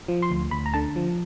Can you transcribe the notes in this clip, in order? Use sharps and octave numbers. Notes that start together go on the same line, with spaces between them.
F3
C6
D2
D2 B5
A#5
D3 A5
F3